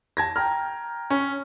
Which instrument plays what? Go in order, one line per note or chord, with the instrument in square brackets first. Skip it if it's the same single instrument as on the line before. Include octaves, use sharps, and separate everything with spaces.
[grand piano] A5 G#6 A#6
G5 A#5 F6
[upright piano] C#4